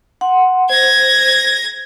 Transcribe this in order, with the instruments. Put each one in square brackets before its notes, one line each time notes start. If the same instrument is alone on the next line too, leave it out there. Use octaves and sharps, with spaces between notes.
[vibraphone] F#5 C6
[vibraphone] C5 [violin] G#6 A#6